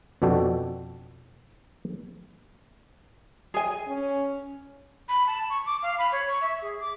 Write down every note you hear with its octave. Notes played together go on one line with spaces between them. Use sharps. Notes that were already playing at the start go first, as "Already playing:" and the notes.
F2 B2 D4 F#4 A4 G5
G#4 G#5
C#4
B5
A5
C#6
D6
F5
B5
C#5
C#6
E5
G#4
D6